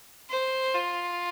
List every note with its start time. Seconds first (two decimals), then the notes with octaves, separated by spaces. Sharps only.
0.30 C5
0.74 F4